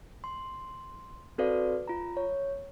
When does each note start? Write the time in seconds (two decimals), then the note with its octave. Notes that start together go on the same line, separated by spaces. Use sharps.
0.24 C6
1.38 C4 F#4 A4 B4 D5 F5
1.88 F4 A#5
2.17 C#5